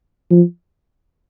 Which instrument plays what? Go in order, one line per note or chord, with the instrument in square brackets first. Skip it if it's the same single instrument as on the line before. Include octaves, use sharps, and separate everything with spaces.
[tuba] F3